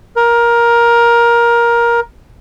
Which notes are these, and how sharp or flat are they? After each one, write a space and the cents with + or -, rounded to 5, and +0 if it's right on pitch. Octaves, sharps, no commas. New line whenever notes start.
A#4 +15